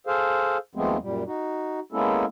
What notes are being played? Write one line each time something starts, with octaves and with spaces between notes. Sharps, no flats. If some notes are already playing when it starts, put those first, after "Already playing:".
G#4 A4 C5 F5
D#2 F3 G#3 A3 B3 C4
F#2 A#2 G3
D#4 F#4
G#3 A#3 B3 C#4 E4 A4